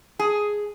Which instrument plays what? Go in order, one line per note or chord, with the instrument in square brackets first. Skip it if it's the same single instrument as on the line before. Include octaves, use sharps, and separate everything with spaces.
[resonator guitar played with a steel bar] G#4